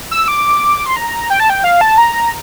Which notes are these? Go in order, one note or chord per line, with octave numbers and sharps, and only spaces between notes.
E6
D6
C6
A#5
G5
A5
G5
F5
A5
A#5